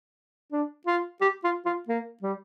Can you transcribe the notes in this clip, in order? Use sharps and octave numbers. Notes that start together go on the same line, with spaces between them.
D4
F4
G4
F4
F4
A#3
G3